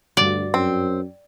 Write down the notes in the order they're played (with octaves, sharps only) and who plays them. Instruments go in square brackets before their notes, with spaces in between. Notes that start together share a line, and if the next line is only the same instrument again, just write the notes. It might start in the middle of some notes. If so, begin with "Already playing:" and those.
[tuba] D2 [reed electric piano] G2 F#4 [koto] D5
[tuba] F#2 [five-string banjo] C4